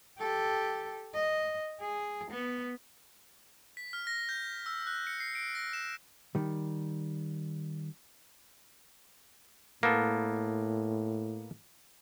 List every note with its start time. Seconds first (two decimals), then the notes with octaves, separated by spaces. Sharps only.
0.18 G4 A4
1.14 D#5
1.81 G#4
2.31 B3
3.77 B6
3.93 F6
4.07 A#6
4.29 G6
4.66 E6
4.87 F#6
5.07 C#7
5.20 C7
5.35 D7
5.55 A#6
5.73 E7
6.35 D#3 G3
9.83 A2 A#3 B3 A4